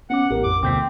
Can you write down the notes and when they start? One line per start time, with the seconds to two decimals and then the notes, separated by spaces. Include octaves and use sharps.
0.10 B3 C#4 F#5 D6
0.31 A1 G4 A#4
0.44 F2 D6
0.63 D2 B2 C4 D6 G6 B6